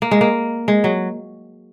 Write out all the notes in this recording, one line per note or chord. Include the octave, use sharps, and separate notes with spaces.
A#3
G#3
A#3
G#3
F#3